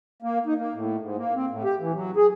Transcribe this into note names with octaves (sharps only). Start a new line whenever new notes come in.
A#3
D#4
A#3
A2
G#2
A#3
C4
A2
G4
E3
F#3
G#4